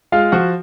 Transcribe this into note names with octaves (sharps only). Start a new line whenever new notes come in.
G#3 F4 F5
F3 F#4 F#5